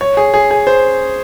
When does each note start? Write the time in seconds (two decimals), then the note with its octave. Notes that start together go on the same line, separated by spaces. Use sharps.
0.01 C#5
0.17 G#4
0.34 G#4
0.51 G#4
0.67 C5